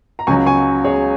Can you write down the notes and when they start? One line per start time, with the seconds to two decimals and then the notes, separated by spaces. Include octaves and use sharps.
0.19 A#5
0.27 C#2 C#3 F#3 G#5 C#6
0.46 G#5 C#6
0.84 G#4 C#5